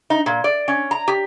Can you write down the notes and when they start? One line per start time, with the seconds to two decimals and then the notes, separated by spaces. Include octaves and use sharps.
0.10 D#4
0.26 A#2
0.44 D5
0.68 C#4
0.91 A#5
1.08 G4